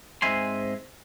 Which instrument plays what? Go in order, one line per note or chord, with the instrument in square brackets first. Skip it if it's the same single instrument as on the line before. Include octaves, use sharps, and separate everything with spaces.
[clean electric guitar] G#2 G#3 C4 E5 G#5 C6